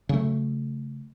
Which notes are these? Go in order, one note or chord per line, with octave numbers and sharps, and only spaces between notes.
C#3 F#3 A3